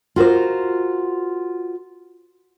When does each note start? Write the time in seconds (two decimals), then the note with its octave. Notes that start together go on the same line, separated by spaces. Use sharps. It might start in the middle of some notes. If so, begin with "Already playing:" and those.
0.16 F4 F#4 A#4 C5